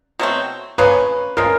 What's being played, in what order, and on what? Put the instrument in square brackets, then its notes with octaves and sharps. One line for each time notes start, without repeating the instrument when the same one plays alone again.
[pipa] B2 F#3 A3 C4
[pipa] C#3 F3 A#3 C#4 [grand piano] B4
[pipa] C#3 F3 G#3 [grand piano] A#4